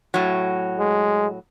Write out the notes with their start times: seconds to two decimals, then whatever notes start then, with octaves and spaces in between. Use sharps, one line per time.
0.14 A2 F#3
0.79 G#3